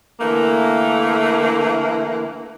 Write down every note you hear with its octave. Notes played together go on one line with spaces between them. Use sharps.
D3 E3 A3 A#3